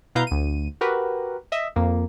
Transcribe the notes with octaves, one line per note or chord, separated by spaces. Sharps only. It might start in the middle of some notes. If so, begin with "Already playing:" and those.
B2 E4 B4 F5 A#5 G6
D2 D#7
F#4 G4 A#4 B4
D#5 E5
F2 A#3